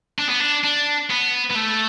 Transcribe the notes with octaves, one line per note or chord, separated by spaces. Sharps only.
D4
B3
D4
D4
B3
B3
A3